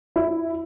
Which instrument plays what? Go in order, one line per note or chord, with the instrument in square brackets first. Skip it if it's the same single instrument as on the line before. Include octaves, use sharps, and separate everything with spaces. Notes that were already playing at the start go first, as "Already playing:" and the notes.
[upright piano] E4